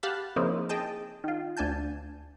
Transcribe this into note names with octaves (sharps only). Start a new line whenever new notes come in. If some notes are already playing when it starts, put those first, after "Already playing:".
G4 F5 F#5 A5 B5
C#3 F3 A#3 C4 D#4 E4
G#4 D#5 G5 A5
D#3 F4
D2 D4 G#5 A5 G6